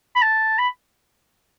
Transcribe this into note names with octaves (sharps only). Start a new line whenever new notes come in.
B5
A5
B5